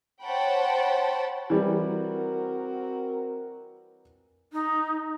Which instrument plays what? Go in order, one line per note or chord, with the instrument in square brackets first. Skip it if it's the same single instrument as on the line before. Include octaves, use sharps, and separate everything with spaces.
[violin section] C5 C#5 F#5 G5 A5 B5
[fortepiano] E3 G3 [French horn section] C4 F#4 A#4
[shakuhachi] D#4